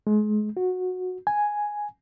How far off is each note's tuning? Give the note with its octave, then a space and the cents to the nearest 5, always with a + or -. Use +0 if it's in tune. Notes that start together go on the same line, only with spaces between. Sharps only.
G#3 +30
F#4 -15
G#5 +0